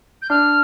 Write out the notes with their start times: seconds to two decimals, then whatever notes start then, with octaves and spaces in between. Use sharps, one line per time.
0.22 G6
0.30 D4 F6